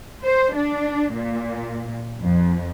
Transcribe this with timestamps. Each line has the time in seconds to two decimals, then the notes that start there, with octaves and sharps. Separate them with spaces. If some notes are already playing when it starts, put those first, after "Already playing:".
0.24 C5
0.54 D4
1.13 A#2
2.21 F2